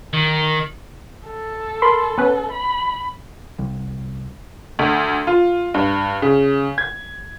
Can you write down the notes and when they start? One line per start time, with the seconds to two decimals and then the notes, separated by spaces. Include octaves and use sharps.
0.13 D#3
1.27 A4
1.82 A#4 B5 C6
2.18 B3 C#4 B4
2.52 B5
3.59 C2
4.79 D2
5.27 F4
5.74 G2
6.22 C#3
6.78 G#6